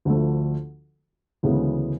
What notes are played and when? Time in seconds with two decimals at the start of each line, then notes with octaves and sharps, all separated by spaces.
0.05 D2 D3 F3 A3
1.43 D2 C#3 E3 G#3 B3